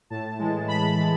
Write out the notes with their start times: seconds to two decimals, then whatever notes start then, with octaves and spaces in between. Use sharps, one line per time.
0.10 A2 A5
0.39 E3 G#3
0.68 A2 B5
0.97 E3 G#3